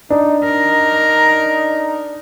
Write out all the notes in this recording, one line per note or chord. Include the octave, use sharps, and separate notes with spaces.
D4 D#4
D#4 A#4